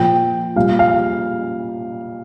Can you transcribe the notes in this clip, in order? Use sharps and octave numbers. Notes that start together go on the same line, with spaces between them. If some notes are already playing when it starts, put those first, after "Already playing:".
Already playing: A#2 F3 G5
A#2 G3 F5
F5